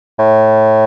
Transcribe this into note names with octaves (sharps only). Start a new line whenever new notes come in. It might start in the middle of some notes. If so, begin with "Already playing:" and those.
A2